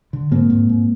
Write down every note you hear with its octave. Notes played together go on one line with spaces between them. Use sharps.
D3
G#2 A#3 C4
G#2
G#2